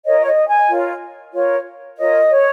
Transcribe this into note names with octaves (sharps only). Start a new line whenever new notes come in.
F4 A#4 C#5 D#5
C#5
D#5
G#5
F4 A#4 C#5
F4 A#4 C#5
F4 A#4 C#5 D#5
C#5